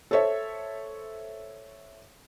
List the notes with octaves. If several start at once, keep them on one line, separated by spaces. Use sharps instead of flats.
A4 C5 C#5 E5